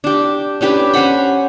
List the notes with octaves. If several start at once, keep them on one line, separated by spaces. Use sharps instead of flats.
D4 G4
C#4 D4 G4 B4
C#4 C5 F#5 B5